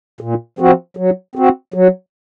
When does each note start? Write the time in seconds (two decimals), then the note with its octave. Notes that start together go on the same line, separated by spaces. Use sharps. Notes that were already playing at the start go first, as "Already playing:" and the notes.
0.21 A#2
0.59 F3 C4 F#4
0.97 F#3
1.35 C4 F#4
1.74 F#3